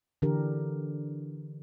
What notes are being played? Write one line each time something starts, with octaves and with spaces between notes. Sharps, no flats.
D3 E3 D4 G4 A#4